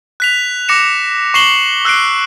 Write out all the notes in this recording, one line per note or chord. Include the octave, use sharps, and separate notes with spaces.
F#6 B6 F7
D6 A#6 C#7 E7
C#6 C7 E7 F#7 G7
E6 F#6 C7 D7